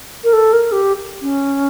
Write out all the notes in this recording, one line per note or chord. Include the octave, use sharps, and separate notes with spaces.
A#4
A4
A#4
G4
C#4